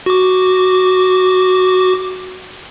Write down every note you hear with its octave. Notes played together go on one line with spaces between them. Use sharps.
F#4 D6